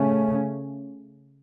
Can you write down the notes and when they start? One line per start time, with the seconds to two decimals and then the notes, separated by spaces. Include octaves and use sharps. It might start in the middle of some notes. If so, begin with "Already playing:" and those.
Already playing: C#3 A3 C#4